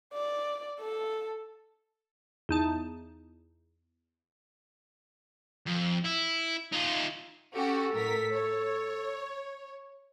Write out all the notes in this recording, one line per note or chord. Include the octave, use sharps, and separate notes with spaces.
D5
A4
E2 D#4 A5
F2
E4
D#4 F4
C#4 F#4 G4 A4
A2 A#4 B6
C#5